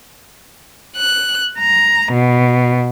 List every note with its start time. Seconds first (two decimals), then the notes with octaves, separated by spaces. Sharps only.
0.97 F#6
1.59 A#5
2.14 B2